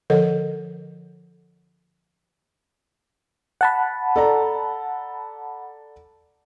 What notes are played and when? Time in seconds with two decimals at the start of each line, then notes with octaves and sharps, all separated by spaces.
0.10 D3 F3 A4 A#4 F#5
3.61 F#5 A5 B5
4.16 A4 D5 A#5